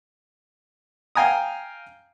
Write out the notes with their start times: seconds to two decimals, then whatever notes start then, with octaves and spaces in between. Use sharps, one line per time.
1.15 F5 G5 G#5 A#5 D#6